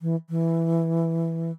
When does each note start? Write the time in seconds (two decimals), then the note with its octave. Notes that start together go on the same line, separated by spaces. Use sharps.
0.02 E3
0.30 E3